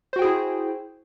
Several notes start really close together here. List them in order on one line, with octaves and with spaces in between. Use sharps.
C5 F#4 G5 G#4 E4